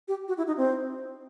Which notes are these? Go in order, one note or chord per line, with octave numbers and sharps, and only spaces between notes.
G4
F#4
E4
D#4
C4